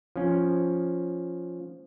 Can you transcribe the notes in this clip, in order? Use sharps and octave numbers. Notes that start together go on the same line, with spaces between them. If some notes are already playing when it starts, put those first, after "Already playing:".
F3 C#4